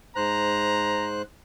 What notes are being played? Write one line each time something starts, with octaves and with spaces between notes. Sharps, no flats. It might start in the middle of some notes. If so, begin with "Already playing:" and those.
G#2 C5 A#5 F#6